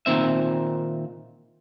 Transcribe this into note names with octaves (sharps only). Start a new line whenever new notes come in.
A#2 D#3 C4 E5